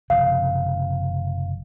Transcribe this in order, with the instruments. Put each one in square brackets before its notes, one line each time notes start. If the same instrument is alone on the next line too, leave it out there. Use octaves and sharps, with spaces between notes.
[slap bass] F#1 C3 F3 [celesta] F5